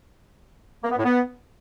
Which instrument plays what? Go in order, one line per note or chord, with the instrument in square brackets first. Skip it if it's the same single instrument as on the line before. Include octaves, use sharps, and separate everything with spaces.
[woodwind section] A#3
B3
A2
B3